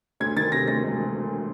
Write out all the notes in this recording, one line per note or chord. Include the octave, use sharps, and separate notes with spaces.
D2 G#6
D#3 A6
C3 A#6
D2 A#6
E1